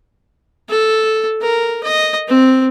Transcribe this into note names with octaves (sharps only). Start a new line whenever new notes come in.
A4
A#4
D#5
C4